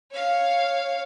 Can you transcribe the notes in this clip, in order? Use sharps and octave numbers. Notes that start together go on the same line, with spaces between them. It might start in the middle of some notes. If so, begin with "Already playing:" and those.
C#5 F5